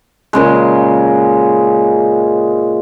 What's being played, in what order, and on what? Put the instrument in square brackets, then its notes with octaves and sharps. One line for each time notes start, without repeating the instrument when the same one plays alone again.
[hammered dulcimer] A#2 C#3 G#3